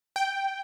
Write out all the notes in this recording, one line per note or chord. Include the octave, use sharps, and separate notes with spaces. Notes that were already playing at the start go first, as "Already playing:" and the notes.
G5